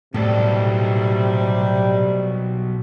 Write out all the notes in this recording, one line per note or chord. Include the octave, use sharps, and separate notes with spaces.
B1 A2 C3 G3 A4